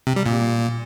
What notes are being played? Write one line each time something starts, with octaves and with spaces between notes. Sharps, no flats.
C3
G3
A#2